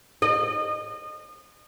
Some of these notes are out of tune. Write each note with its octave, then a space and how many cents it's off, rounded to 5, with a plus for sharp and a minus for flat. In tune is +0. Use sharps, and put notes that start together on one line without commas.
D#5 -30